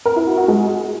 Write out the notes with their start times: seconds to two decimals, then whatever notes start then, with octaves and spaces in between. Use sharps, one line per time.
0.06 A#4
0.16 E4
0.27 F#4
0.38 F#4
0.48 G#3